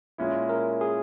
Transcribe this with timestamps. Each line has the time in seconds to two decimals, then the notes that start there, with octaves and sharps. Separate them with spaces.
0.18 A#2 G#3 C#4 E4
0.49 A#4
0.81 G#4